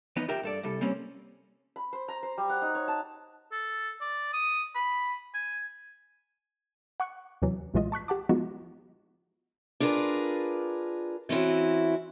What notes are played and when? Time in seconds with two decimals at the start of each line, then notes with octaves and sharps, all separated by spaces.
0.16 E2 B3 D#4 B4 D#5
0.28 F4 G4 A#4 E5 G5
0.43 G2 A4 D5
0.63 C2 G3 A4
0.81 G3 A#3 C4 C#4
1.76 B5
1.93 C5
2.08 A#5
2.23 C5
2.38 G3
2.50 F#5
2.62 D#4
2.75 C#5
2.88 A5
3.52 A4
4.01 D5
4.33 D#6
4.75 B5
5.34 G#5
7.00 F#5 C#6 F#6 C#7
7.42 D#2 C3 E3 F#3
7.74 B1 A#2 E3 G#3 F4 D#5
7.92 A5 C#6 F#6 B6
8.08 G4 F#5 A5 D6
8.29 F3 G#3 B3 D#4 F4 F#4
9.80 D4 F4 G#4 A#4 B4
11.29 E3 C4 C#4 E4 F#4